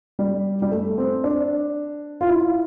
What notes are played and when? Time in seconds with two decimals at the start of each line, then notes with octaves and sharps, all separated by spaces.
0.19 G3
0.62 G3
0.72 A3
0.98 C4
1.24 D4
2.21 F4
2.29 E4